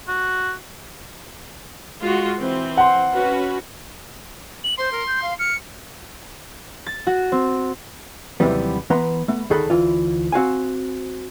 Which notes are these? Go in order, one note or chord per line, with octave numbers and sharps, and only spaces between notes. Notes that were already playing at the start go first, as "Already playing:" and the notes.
F#4
G#3 F4 F#4
E3 C4
F#5 C6
C#4 F#4 B4
F#7
C5 C6
A#4
G6
F5
F6 C#7
A6
F#4
C4
D#2 C3 E3 F#3 G3 B3
E3 B3 B4 A#5 C6
A3 B3
D2 D#3 G#4 A4 F#5 B5
D2 E3 F4
C4 F#4 F5 G#5